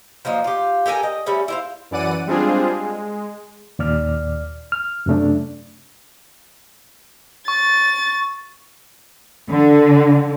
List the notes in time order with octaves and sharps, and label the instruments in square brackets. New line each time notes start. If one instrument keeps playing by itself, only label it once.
[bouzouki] F3 F#3 A#3 D#4
F4 G4
G4 A4 A#4 G#5
D#5
G3 A3 C#4 E5
E4 C5 F5
[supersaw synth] F#2 E3 D5 F#5 D#7
G3 G#3 C4 D4 F4 G#4
G#3
[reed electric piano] D#2 A#2 D5 F6
F6
F#2 C3 A3 D4
[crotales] C#6 [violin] A6
[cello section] D3